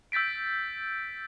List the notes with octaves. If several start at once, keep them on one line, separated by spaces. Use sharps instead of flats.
E6 G6 A6 B6 D7